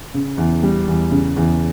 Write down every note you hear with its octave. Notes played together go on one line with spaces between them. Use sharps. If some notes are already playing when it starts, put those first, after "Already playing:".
C#3
E2
G3
E2
C#3
E2